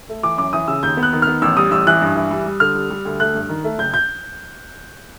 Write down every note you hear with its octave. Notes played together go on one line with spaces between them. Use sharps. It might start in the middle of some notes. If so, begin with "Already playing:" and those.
A3
E3 D6
F#2 D6
E3 D#6
C#3 E6
D#2 G6
B3
F#6
D#3
B3 F6
A1 E6
G3 D#6
A1 E6
E3 F#6
G2
E3
G3
G3
D3 F6
G3
G3
D2
A3 F#6
G2
D#3
A3
F#1 G6
G6